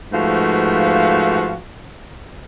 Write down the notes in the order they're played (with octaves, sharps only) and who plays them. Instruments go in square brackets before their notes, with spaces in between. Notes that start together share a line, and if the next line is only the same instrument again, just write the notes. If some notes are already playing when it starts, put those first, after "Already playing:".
[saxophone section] G#2 F3 A3 F#4 B4 F5